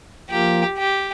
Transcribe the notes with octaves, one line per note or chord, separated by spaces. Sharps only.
F3 A#3 F4 G4 A#4
G4